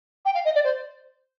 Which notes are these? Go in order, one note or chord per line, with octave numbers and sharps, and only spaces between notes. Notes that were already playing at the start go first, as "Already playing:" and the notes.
G5
F5
D#5
D5
C5